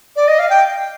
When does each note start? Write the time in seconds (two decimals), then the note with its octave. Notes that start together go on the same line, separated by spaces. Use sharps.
0.16 D5
0.28 D#5
0.39 F5
0.50 G5